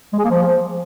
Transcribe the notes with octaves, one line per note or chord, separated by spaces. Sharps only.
G#3
G#4
A#3
F3